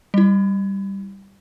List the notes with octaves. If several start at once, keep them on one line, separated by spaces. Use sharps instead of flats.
G3 E4